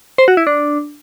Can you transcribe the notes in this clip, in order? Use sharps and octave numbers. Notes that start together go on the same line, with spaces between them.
C5
F#4
E4
D4